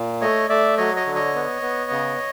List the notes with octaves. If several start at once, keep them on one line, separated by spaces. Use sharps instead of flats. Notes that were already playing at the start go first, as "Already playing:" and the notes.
Already playing: A#2
A3 C#5 D#5
A3 D5 E5
F#3 C#5 D#5
C#5 D#5
D3
C#5 D#5
B3
B3
C#3